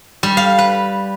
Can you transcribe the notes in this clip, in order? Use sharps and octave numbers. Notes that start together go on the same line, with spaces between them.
G3
F5
B4